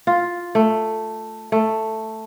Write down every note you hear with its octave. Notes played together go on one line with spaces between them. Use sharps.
F4
A3
A3